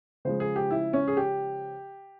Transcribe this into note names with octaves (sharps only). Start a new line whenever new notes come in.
C#3 F3 G#3 C5
G#4
G4
E4
C#4
G#4
G4